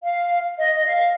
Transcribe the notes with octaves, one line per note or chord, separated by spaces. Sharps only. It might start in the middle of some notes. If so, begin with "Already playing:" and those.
F5
D#5
F5